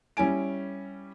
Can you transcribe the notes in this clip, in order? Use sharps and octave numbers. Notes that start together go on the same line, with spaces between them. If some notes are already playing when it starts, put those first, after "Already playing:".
G3 C#4 E4 G#5 D7